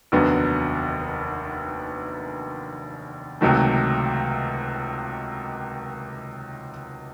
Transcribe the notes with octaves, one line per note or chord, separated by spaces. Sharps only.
F1 D#2 D3 F#3 B3
C#2 C3 D#3 F#3 A3